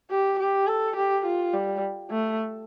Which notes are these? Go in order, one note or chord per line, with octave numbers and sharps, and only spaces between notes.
G4
G4
A4
G4
F4
G3
A3